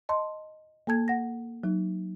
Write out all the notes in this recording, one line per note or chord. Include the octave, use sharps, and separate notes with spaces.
D#5 A5 C6
A#3 A4 A5 G#6
F#5 A#6
F#3 D#4